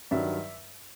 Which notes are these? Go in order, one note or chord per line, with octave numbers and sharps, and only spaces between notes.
G2 D#3 F#3 D5 E5